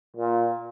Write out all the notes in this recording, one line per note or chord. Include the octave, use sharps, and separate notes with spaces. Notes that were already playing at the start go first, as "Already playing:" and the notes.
A#2